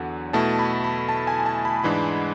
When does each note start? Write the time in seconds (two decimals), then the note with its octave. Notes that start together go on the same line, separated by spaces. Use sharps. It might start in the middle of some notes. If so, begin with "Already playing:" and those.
Already playing: E2 D3 F#3 F#5
0.33 B2 A3 E4 A5
0.59 B5
0.84 B5
1.09 A5
1.27 G#5
1.46 A5
1.65 B5
1.84 G#2 E3 G#3 D4 B5